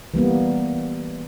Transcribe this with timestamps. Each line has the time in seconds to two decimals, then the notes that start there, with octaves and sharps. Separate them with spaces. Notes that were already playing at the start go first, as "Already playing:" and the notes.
0.14 E3 G3 A#3 B3